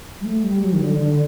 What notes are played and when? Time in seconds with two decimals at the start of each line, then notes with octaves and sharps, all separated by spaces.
0.21 G3
0.25 A3
0.43 G3
0.62 F#3
0.73 D#3
0.81 D3
0.99 D3